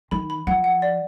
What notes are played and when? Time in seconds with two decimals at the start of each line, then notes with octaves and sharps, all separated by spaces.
0.11 D#3 B5
0.30 B5
0.47 F3 F#5
0.64 F#5
0.82 D5